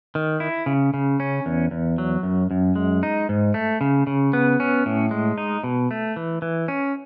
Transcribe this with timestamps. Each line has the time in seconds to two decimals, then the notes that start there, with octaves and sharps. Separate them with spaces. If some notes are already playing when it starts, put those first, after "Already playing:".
0.15 D#3
0.40 E4
0.66 C#3
0.94 C#3
1.20 C#4
1.46 E2
1.71 E2
1.98 F#3
2.23 F#2
2.51 F#2
2.76 G#3
3.03 D#4
3.29 G#2
3.54 A3
3.81 C#3
4.07 C#3
4.33 B3
4.60 C#4
4.86 A2
5.11 G#3
5.38 D#4
5.64 B2
5.91 A3
6.16 E3
6.42 E3
6.68 C#4